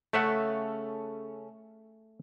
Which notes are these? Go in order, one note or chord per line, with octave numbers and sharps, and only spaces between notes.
C#3 A3 C#4 A4 E5 F#5